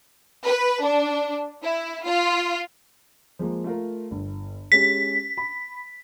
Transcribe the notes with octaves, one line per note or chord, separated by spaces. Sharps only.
B4
D4
E4
F4
F3 G#3 A#3
A3 F4 A#4
G1
G#3 C#4 G4 B6
B5